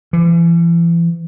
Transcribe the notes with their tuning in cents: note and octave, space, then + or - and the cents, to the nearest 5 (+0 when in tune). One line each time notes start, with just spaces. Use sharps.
E3 +40